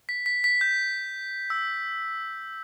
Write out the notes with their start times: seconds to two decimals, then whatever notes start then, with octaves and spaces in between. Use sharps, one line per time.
0.09 B6
0.26 B6
0.44 B6
0.61 G6
1.50 E6